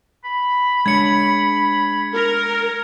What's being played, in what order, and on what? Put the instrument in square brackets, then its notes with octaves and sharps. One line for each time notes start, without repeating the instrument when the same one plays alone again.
[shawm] B5
[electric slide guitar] G#3 D4 C#5 [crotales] G#6 C#7
[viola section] A#4